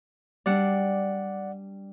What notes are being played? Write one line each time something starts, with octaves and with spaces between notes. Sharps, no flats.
G3 D4 D5 F#5